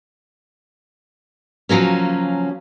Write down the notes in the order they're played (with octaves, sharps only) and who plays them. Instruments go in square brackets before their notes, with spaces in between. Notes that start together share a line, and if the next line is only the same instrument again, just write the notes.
[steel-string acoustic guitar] C#3 F3 F#3 A#3 C#4